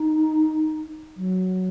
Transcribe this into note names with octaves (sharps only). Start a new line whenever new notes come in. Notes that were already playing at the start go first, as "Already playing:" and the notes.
Already playing: D#4
F#3